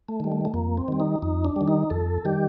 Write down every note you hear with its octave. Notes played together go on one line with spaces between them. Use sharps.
A3
D#3 G3
A3
A3
F2 A#3
C4
D#3 G3
D#4
F2 D#4
D4
D#3 G3
D#4
F2 A4
D#3 G3 G4